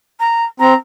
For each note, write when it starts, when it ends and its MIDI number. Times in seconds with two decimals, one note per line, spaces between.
0.20 0.44 82
0.60 0.74 60
0.60 0.75 82